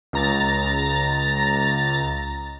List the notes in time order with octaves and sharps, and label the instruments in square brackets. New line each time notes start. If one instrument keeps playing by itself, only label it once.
[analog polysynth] C#2 A#5 A6